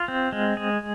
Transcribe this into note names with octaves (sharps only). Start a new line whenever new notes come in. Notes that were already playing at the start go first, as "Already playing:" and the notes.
Already playing: F4
C4
G#3
G#4